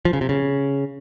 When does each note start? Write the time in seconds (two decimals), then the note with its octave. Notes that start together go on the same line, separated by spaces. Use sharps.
0.05 F3
0.13 C#3
0.21 C3
0.29 C#3